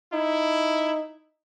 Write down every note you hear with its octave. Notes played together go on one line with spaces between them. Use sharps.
D#4 E4